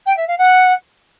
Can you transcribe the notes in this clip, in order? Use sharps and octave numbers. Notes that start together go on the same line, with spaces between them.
G5
E5
F5
F#5